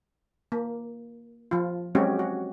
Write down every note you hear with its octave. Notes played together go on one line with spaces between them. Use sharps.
A#3
F3 F4
F#3 G#3 C4 C#4 F#4 G4
F#4